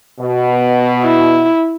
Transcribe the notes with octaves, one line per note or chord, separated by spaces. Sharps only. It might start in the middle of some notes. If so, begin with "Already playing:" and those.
B2
E4